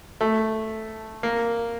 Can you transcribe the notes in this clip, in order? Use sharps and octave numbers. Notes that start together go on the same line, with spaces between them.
A3
A#3